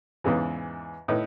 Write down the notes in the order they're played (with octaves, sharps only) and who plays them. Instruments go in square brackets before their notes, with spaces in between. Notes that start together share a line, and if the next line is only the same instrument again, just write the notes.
[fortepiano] E2 G#2 C#3 E3
A2 D#4 B4